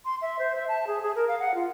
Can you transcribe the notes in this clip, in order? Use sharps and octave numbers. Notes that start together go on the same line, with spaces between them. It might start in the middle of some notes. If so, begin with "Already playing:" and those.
C6
E5
C5
E5
A5
G#4
G#4
A#4
F5
F#5
F4